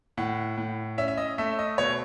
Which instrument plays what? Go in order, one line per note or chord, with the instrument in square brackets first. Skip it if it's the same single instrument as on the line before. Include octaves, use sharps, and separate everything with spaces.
[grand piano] A2 F#5
A2
C#4 E5
E5
D#5
A3 E5
D#5
B2 C#5